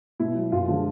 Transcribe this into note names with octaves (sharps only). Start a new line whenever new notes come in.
B2 E4
F#3
F#2 F4
D3 F3 G#3